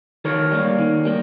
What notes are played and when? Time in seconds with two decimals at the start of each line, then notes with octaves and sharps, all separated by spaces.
0.25 D#3 A#4 C#5
0.51 G3 A#3
0.79 D#3
1.05 G3 A#3